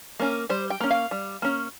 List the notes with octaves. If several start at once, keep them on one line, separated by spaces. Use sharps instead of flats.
A#3 C#4
G3 C5
G5
A#3 C#4
F5
G3
A#3 C#4